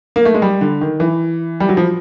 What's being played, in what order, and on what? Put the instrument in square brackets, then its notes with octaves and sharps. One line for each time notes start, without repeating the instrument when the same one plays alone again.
[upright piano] A#3
A3
G#3
G3
D3
D#3
E3
G3
F#3
F3